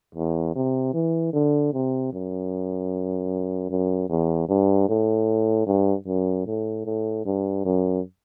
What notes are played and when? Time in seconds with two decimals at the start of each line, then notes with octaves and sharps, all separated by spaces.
0.15 E2
0.56 C3
0.94 E3
1.33 D3
1.73 C3
2.13 F#2
3.70 F#2
4.10 E2
4.49 G2
4.89 A2
5.67 G2
6.07 F#2
6.46 A2
6.86 A2
7.26 G2
7.65 F#2